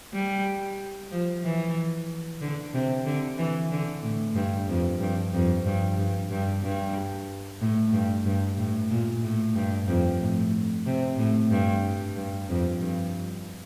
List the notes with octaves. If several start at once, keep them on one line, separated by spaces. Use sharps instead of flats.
G3
F3
E3
D3
C3
D3
E3
D3
A2
G2
F2
G2
F2
G2
G2
G2
G2
A2
G2
G2
A2
A#2
A2
G2
F2
A2
C3
A2
G2
G2
F2
G2